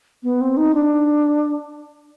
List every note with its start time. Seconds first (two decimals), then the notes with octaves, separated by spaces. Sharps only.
0.23 B3
0.41 C4
0.57 D#4
0.74 D4